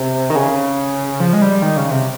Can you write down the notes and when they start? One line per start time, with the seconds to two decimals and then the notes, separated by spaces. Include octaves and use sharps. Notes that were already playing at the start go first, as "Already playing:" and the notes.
Already playing: C3
0.30 D#3
0.36 C#3
1.20 F3
1.33 G#3
1.42 G3
1.62 D#3
1.77 C#3
1.91 C3